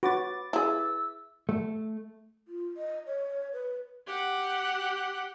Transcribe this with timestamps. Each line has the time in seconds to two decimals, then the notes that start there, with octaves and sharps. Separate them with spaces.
0.03 F#4 B4 D6 A6
0.53 E4 G#4 E6
1.49 A3
2.48 F4
2.77 D#5
3.06 C#5
3.53 B4
4.07 G4 F#5